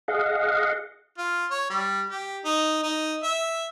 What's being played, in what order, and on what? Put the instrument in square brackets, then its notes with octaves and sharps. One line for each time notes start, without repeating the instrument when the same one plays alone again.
[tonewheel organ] G#4 D#5 F5 F#5
[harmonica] F4
C#5
G3
G4
D#4
D#4
E5